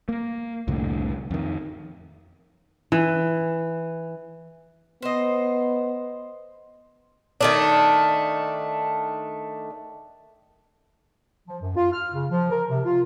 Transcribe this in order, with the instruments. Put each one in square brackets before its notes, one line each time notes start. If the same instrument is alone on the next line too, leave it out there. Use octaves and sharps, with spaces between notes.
[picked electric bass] A#3
C2 F2 A2 D3
F2 D#3
[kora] E3
[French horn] B3 [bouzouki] C5 D#5
[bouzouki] D#3 A3 D4
[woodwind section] F3
F#2
F4
F6
C#3
F3
A#4
C3
F4